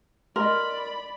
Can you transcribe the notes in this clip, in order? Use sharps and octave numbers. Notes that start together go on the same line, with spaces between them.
A#4 D5 D#5 B5 C6